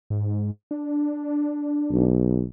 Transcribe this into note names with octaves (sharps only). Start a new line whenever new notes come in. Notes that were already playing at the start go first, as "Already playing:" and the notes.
G#2
D4
B1